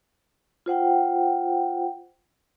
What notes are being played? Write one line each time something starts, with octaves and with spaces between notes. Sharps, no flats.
F4 C5 F#5 G5